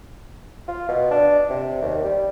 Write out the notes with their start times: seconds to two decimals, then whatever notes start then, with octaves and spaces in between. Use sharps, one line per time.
0.68 F4
0.89 B2
1.11 D4
1.50 C3
1.82 D#2
2.05 G3